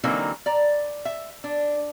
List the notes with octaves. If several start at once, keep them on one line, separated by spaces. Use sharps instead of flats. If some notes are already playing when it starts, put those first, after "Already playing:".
D3 E3 F#3 A#3 C4 D#4
D5 A#5
E5
D4